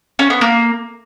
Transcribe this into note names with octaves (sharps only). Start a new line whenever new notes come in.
C#4
B3
A#3